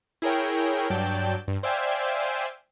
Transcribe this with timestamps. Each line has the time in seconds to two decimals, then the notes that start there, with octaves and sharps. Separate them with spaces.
0.22 E4 G#4 A#4 C#5 G5
0.90 G2 F#3 D5 G5 A5 G6
1.48 G2
1.63 C5 D5 E5 F5 G5 G#5